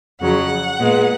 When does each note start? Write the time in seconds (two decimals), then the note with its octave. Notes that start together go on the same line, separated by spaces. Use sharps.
0.20 F2 C#3 F#3 F#5
0.79 A#2 G#3 B3